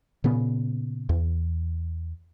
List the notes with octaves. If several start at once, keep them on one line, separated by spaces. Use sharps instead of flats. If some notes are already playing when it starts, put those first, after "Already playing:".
A#2 C#3 B3
E2